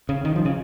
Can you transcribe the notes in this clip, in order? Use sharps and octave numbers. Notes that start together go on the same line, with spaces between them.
C#3
D#3
F3
C#3